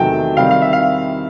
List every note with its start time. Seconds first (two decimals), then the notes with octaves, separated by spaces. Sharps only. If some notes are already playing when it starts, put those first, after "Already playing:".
Already playing: E2 C3 D#3 F#3 A3 G5 A5
0.37 C3 D#3 G3 C4 D#4 F5
0.51 F5
0.62 E5
0.73 F5